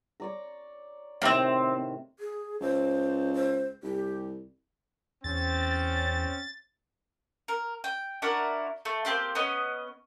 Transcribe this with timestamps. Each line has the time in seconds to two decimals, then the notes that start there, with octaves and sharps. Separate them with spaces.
0.20 C#5 D5 A#5
1.22 A2 C3 D#3 A#3 C4
2.19 G#4
2.61 C#2 C5
3.34 C5
3.83 C2 G4
5.24 E2 C4 C#4 A6
7.48 A#4
7.84 G5
8.22 D4 E4 F#4 A#4
8.85 A3
9.05 A#3 C4 G4 C6
9.35 B3 C#4 D#5